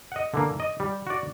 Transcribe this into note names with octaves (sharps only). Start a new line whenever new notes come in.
D#5 F#5
D3 E3 A#3
D#5
G3
F#4 D5